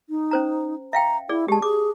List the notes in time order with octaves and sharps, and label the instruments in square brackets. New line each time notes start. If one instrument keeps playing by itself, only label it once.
[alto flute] D#4
[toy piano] C#4 C5 A#5
[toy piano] E5 F5 G5 [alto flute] A#5
[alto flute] E4 [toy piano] G#4 D5
[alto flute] G#3 [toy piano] G4 A5
[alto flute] G#4 [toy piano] D6